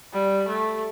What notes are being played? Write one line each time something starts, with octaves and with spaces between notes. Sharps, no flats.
G3
A3